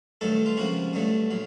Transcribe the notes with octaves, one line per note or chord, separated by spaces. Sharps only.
G2 D#3 F#3 A3 A4
F4
C#2 C3 F3 A#3 F#4
G2 D3 F#3 A3
A#2 F#3